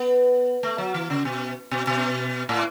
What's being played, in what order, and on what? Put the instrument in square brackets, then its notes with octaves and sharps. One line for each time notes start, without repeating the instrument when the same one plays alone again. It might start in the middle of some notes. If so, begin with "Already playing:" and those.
Already playing: [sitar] B3
A3
F#3
E3
C#3
B2
B2
B2
A2